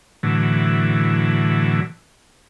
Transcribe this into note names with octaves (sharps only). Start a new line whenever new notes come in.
A2 D3 E3 F#3